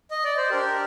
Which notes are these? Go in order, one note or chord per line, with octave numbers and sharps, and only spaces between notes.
D#5
D5
C5
D4 G4 A#4